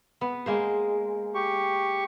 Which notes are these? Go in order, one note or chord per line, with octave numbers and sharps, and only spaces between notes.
B3
G#3 A#3 C5
G4 C#6